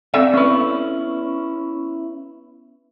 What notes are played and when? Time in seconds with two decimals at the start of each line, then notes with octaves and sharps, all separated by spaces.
0.14 C4 A4 D5 E5
0.34 B3 C#4 E4 B4